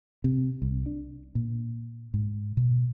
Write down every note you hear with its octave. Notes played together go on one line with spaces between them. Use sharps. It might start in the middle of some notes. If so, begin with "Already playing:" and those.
C3
C2
D4
A#2
G#2
B2